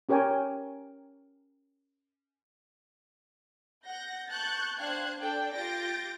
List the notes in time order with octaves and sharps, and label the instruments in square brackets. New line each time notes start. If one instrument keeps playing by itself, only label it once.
[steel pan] C#4 G4 A#4 C#5 G5 G#5
[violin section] F#5 G6 A#6
A5 C#6 F#6 G6 A6
D4 C5 F5 G5 F#6 G#6
D4 A4 D5 G5
F4 G4 G6 A6 A#6 D7